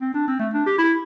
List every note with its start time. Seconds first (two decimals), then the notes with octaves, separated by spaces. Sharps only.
0.01 C4
0.14 D4
0.28 C4
0.40 A3
0.54 D4
0.66 G4
0.78 E4